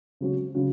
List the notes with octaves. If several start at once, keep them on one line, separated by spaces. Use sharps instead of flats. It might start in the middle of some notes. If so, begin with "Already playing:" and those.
C#3 F#3 C#4 F#4
C#3 F#3 C#4 F#4